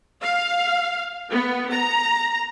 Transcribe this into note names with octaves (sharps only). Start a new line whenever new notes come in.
F5
B3
A#5